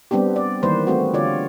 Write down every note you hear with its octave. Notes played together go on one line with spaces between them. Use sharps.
G3 B3 C4 D4 G4
D5
D#3 E3 G3 A#3 B4 C5
A3 C4 F#4
D3 F4 C#5 D5